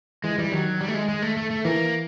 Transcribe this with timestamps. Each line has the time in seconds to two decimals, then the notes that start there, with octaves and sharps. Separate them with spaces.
0.24 E3 G#3
0.38 E3 G3
0.52 D#3 F#3
0.81 G3
0.88 A3
0.94 G#3
1.08 G#3
1.22 A3
1.37 A3
1.51 A3
1.65 E3 A#3